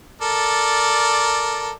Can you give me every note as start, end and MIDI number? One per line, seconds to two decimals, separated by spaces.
0.22 1.72 69
0.22 1.72 70
0.22 1.72 74